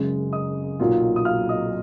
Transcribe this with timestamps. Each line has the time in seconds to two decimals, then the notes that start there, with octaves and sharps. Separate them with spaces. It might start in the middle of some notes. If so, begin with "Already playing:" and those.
Already playing: F#1 F#2 C#3 G#3
0.33 D#5 D#6
0.80 B1 A#2 F#3 A#3 F4
1.16 D#6
1.25 F5 F6
1.49 D#5 D#6